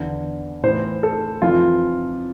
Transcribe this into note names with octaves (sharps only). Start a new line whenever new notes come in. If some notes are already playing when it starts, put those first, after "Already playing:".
Already playing: E2 D3
A2 E3 C5
A4
F2 E3 F4